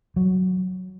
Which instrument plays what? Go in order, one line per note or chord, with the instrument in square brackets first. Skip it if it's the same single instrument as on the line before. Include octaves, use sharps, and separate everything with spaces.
[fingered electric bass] F#3